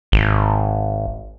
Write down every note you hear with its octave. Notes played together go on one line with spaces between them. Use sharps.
G#1